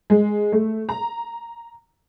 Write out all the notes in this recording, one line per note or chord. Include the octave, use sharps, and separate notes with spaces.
G#3
A3
A#5